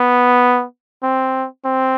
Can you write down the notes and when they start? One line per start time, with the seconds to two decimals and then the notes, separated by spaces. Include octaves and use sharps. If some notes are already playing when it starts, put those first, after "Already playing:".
Already playing: B3
1.03 C4
1.65 C4